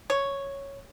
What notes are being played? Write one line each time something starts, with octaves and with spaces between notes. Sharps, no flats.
C#5